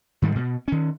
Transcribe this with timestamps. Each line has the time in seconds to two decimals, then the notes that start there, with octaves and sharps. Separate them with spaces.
0.22 G#2 D#3 G3 G#3
0.35 B2
0.68 D#3 C#4